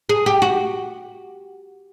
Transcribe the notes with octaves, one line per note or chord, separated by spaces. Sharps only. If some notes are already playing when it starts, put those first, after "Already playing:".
G#4
G4
F#4